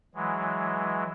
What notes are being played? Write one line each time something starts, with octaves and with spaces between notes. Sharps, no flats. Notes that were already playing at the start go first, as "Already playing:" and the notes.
E3 F#3 G#3